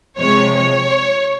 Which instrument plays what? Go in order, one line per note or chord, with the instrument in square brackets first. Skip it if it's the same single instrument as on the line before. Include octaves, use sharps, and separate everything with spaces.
[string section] C3 F3 G#3 C#5
C#5